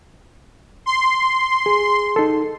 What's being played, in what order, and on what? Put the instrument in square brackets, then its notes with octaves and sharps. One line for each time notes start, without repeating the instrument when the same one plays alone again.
[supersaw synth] C6
[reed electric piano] G#4
D#4 A4